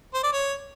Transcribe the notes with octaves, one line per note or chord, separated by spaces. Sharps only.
C5
D5
C#5